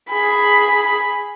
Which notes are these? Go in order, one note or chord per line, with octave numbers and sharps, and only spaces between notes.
G#4 B5